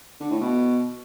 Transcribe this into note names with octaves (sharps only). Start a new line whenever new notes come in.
D3
A2
B2